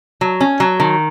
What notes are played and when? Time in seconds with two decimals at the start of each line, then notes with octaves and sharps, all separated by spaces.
0.21 F#3
0.41 C#4
0.60 F#3
0.80 D#3